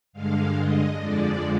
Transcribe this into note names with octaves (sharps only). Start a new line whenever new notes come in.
G2 D3 G#3 F5
D#5
F2 D3 F3 G#3 D5